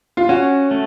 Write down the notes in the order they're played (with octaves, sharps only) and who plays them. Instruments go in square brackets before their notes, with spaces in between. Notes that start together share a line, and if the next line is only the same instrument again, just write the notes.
[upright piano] F4
[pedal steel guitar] C#4 [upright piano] F#4
[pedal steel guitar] A3